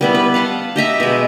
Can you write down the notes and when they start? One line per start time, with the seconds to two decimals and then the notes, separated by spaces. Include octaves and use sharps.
0.01 G3 B3 E4
0.15 B4
0.34 F5 F#5 A5 C6
0.76 G4 D#5 E5 A#5
1.00 B2 G#3